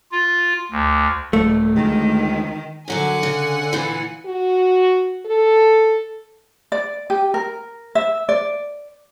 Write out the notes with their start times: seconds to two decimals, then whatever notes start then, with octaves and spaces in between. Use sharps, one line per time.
0.12 F4
0.71 D2
1.33 D#1 A3
1.76 D2 D#3 G#3
2.88 F#2 D3 E3 F#3 F#5 G#5
3.23 C#3
3.73 A#2 E3
4.26 F#4
5.26 A4
6.72 D5
7.10 G4
7.34 A#4
7.95 E5
8.29 D5